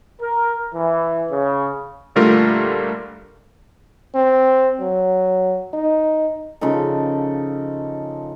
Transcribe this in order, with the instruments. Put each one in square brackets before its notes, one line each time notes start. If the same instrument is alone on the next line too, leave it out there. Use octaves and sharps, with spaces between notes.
[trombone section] A#4
E3
C#3
[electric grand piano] A#2 D3 G3 A3 F4 A#4
[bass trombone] C4
F#3
D#4
[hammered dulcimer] C#3 F3 D#4 A4